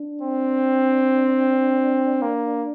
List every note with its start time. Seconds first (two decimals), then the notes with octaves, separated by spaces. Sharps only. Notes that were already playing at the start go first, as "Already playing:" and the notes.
Already playing: D4
0.22 C4
2.22 A#3